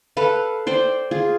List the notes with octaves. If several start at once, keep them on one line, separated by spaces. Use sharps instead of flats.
A4 B4 F5
C5 D5 G5
F4 G#4